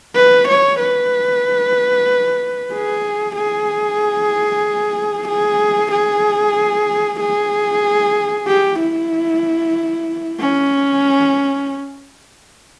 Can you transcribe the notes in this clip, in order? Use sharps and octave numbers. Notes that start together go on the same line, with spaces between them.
B4
C#5
B4
G#4
G#4
G#4
G#4
G#4
G4
E4
C#4